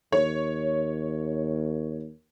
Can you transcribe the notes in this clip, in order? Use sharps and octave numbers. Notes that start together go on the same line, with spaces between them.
D#2 C#5